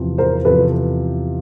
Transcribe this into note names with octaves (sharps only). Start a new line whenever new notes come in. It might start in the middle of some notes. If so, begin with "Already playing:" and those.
Already playing: E2 C3 F3
A#4 C5
E2 C3 F3 A4 B4